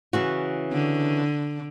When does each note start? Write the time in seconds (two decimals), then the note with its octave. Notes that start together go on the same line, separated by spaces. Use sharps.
0.13 C#3 E3 F#4
0.72 D3